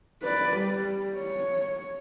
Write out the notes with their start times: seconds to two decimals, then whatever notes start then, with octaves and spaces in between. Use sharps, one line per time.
0.22 B4 D5
0.57 G3
1.18 C#5